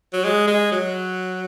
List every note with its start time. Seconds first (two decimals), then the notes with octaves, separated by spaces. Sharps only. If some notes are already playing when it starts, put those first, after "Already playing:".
0.13 F#3
0.24 G#3
0.47 G#3
0.71 F#3